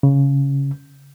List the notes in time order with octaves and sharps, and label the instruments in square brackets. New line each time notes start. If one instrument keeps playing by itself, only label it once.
[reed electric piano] C#3